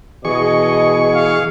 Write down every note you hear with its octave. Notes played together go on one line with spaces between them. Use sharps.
B2 E3 G#4 D#5 C#6
F5